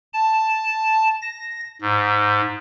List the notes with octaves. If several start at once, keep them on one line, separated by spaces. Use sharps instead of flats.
A5
A#6
G#2